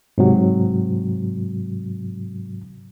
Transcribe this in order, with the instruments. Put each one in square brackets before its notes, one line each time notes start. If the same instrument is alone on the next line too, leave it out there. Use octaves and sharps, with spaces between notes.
[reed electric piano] G#2 C3 F#3